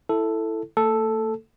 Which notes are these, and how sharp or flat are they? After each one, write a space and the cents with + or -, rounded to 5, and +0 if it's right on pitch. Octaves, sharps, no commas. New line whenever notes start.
E4 +0 A4 +5
A3 +45 A4 +0